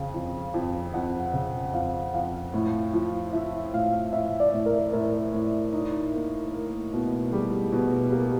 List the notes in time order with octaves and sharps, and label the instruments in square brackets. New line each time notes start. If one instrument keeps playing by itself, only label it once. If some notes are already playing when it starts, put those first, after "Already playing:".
Already playing: [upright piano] F2 C#3 [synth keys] F5
[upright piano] F2
F2
[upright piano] F2 [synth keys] F#5
[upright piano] C#3
[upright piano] F2 [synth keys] F5
[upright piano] F2 [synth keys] F5
[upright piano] A2
F3
[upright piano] F3 [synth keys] E5
[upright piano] A2 [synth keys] F5
[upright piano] A2 [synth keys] E5
[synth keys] D5
[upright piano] A2
[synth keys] A#4
[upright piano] A2 [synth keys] A#4
[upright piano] A2
D#4
A#3
A#3
B2
[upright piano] G3 [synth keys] G#4
[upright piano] B2
[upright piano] A#3 [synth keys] G4